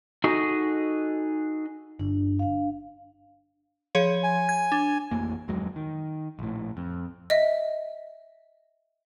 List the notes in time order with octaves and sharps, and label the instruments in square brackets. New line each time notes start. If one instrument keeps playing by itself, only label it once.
[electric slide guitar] D#4 F#4 G#4 A4 D#5
[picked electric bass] G1 [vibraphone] D4
[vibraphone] D4 F5
[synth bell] F3 G#4 C#5
[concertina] G#5
[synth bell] G#6
D4
[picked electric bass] A1 F2 A2 A#3
D1 F2 F#3 G#3
D#3
A#1 A2
F2
[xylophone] D#5 E5